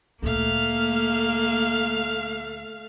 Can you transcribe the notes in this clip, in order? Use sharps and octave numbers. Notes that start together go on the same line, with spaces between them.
D2 A#2 A3 A#3 F5